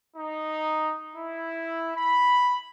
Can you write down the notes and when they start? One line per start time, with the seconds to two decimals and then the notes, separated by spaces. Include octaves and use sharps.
0.16 D#4
1.15 E4
1.97 B5